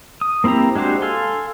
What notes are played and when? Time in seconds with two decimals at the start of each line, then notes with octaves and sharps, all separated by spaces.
0.21 D#6
0.44 A#3 C4 E4 G4 A#5
0.76 G#3 D4 F#4 G4 C5
1.02 A4 F5 G#5 C6